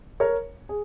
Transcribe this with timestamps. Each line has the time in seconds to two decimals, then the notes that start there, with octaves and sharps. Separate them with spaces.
0.20 A#4 C#5
0.69 G#4